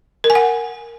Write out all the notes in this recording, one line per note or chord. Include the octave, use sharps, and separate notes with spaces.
A#4
G#5
F#5